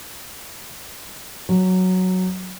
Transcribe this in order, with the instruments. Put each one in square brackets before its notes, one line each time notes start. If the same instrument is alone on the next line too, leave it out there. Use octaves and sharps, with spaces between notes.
[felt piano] F#3